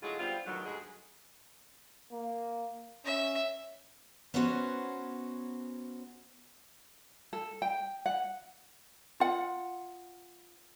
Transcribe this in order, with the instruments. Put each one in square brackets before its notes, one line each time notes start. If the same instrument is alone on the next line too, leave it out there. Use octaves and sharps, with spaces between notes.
[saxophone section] A2 D3 F#3 G#3 F4 G#4
G3 B3 C4 D4 F4
D2 G#2 B2 D#3 F#3
D2 G2 G#3 G#4
[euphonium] A#3
[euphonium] C#4 [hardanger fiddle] E5
[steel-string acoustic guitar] B3 C#4 D#4 F#4 C5 C#5
[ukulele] A4
G5
F#5
F4 F#5